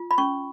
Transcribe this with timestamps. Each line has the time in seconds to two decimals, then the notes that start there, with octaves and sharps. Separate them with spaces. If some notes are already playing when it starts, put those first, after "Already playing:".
Already playing: F4
0.11 B5
0.18 C#4 C#6